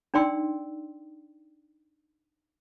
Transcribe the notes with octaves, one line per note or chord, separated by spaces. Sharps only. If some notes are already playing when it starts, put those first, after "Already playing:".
D4 D#4 D5 G5 C6 E6